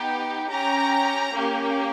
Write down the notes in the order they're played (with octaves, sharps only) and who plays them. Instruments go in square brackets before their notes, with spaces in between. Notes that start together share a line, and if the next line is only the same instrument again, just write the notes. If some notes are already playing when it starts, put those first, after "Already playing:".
Already playing: [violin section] B3 D#4 G4
C#4 G4 A#5
A#3 C#4 G4